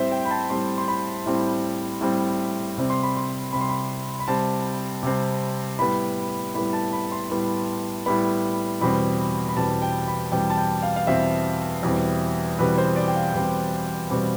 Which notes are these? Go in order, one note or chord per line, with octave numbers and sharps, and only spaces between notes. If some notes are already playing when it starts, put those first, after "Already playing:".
Already playing: A2 G3 C4 C5 E5
G5
B5
A5
A2 G3 C4 C6
C6
B5
A2 G3 C4
A2 G3 C4
C3 G3 C4
C6
B5
C6
C3 G3 C4 B5
C6
B5
B5
C3 G3 C4 A5
C3 G3 C4
A2 G3 B3 B5
A2 G3 B3 B5
A5
B5
C6
A2 G3 B3
A2 G3 B3 B5
E2 B2 G3 C4 B5
B5
E2 B2 G3 C4 A5
G5
B5
E2 B2 G3 C4 G5
A5
G5
F5
F5
E2 B2 G3 C4 E5
E2 B2 G3 C4
E2 B2 G3 C4 B4
C5
D5
G5
F5
E2 B2 G3 C4
B2 G3 C4